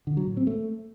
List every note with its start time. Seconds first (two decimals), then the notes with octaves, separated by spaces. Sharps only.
0.07 D3
0.17 F#3
0.27 A2
0.37 C4
0.47 A3